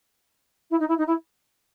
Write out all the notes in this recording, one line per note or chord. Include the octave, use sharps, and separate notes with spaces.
E4
D#4
E4
D#4
E4